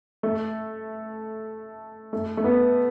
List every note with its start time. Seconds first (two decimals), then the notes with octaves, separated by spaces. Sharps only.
0.23 A3
2.13 A3
2.37 A3
2.44 B3